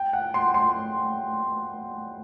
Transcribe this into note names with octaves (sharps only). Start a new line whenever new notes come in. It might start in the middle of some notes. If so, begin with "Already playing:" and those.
Already playing: G5
F#5
C6
C6